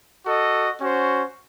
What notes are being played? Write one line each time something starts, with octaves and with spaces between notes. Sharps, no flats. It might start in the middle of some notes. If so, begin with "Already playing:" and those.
F#4 A4 D#5
C#4 F#4 C5